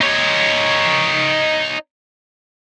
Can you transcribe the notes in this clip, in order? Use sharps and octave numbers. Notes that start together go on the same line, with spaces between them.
D#4 C#5